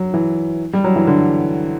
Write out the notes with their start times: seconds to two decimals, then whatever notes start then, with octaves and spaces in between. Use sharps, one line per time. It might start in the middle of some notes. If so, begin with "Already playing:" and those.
Already playing: F#3
0.14 E3
0.73 G3
0.84 F#3
0.96 E3
1.07 D3